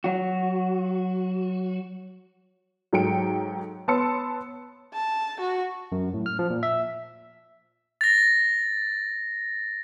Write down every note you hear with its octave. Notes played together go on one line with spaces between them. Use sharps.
F#3 F#4
G#2 F#3 A4 G5 C#7 D7
B3 C#5 A5 C6 E6 C#7
A5
F#4
F#2
A2
F6
F3
A#2
E5
A6 A#6